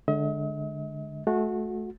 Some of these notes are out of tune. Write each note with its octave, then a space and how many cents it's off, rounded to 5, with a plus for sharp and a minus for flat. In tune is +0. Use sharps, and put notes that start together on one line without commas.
D3 +0 G#3 +10 D#5 +45
A3 -30 F#4 -20